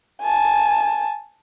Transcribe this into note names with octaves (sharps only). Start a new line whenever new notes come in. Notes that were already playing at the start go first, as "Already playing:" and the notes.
G#5 A5